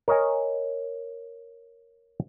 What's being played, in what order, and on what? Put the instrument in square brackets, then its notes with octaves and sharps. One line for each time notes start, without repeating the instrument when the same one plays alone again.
[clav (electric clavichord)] A#4 C#5 D#5 G#5